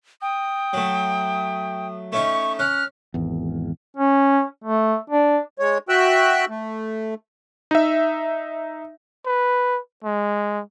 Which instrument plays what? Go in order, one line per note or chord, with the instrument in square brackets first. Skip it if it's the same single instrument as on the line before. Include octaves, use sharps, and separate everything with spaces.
[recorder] G5 [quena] D#6
[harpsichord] F#3 A3
[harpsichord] A3 C#4 D#4 [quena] C#6
[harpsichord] C#4 [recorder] F6 [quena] F#6
[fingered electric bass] G#1 E2
[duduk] C#4
A3
D4
[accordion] G#3 C#5
F#4 E5 G5 E6 F#6
A3
[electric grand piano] D#4 E5
[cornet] B4
G#3